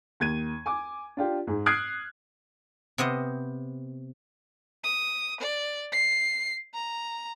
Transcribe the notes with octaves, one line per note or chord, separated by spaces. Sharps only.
D#2 G#6 D#7
G#5 D6
D4 F4 G4
G#2 G#4
D#6 F6 F#6 G#6 C7 D7
C3 B3 C5 D#5
D#6
D5
C7
A#5